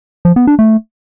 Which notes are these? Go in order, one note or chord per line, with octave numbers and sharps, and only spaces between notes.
F3
B3
D4
A3